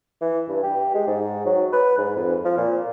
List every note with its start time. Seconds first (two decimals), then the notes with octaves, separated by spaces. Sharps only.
0.21 E3
0.48 G2
0.63 G4
0.94 G#3
1.07 G#2
1.45 F#3
1.73 B4
1.97 G#2
2.16 F2
2.44 F3
2.57 A#2